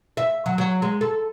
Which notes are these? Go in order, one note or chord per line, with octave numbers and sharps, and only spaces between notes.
E5
F#3
F#3
G#3
A4